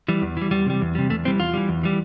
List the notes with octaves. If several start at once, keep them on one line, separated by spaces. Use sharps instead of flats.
E3 G3
E2
E3 G3
E2 G3
C3 G3
E2
C3 G3
E2 A3
E3 G3 C4
E2 F4
E3 G3
E2
E3 G3